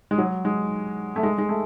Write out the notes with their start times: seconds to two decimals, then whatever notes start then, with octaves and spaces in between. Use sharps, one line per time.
0.11 G#3
0.18 F#3
0.45 G#3
1.16 A3
1.23 G#3
1.38 G#3
1.49 A3